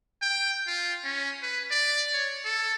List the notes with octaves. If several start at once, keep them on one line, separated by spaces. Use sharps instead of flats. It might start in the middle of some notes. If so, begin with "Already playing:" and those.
G5
F4
C#4
B4
D5
C#5
A4